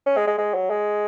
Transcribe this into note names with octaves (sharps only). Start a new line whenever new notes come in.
C#4
G#3
G#3
G#3
F#3
G#3